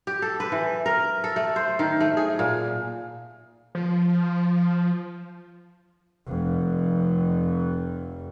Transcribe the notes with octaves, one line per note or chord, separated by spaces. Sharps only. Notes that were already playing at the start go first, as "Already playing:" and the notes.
G4
A4
B4
E3
A#4
A4
A3
C5
D#3
A3
G#4
A#2
F3
F1 F2